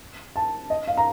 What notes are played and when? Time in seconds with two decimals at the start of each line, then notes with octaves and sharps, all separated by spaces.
0.36 A5
0.70 D#5
0.87 F5
0.97 A#5